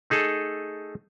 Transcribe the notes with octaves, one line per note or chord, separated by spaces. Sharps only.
A3 D#4 G#4 A4